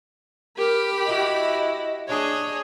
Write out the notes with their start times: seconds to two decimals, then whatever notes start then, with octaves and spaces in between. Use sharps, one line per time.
0.58 G4 A#4 B5
1.06 E4 F#4 D#5
2.08 D4 G#4 C#5 D#5